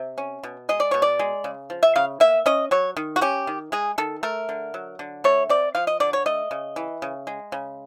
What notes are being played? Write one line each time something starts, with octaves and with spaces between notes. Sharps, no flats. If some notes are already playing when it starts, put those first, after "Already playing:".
Already playing: C3
C#4
B2
G#3 D#5
D5
B2 C#5
D5
G#3
C#3
F3
E5
C#3 F5
A#3 E5
C#4 D#5
F#3 C#5
D#3
F#4
C#4 G4
D#3
G#3 G#4
D#3 A4
A3 A#4
D3
F#3
D3
A3 C#5
C4 D5
F3 F5
D#5
D3 D5
C#5
A3 D#5
C#3
E3
C#3
G#3
C#3